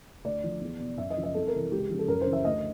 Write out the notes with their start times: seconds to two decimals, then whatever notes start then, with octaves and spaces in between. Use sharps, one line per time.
0.24 D2 D5
0.44 D3 F3
0.61 E2
0.80 B2
0.98 F#2 E5
1.10 D#5
1.17 C#3 F3
1.23 D#5
1.34 C2 A4
1.47 A#4
1.53 C3 E3
1.72 C#2 G4
1.90 C#3 F3
1.99 A4
2.08 F#2 A#4
2.21 C5
2.27 C#3 E3
2.33 E5
2.45 D2 D#5